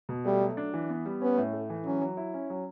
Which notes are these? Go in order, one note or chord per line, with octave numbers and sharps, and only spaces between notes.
B2
G3 A3
F#3
D4
E3
B3
G3
B3 C#4
A2
A3
E3
F#3 C#4
F#3
E4
C#4
F#3